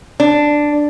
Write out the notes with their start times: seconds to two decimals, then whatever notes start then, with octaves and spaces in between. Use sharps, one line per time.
0.20 D4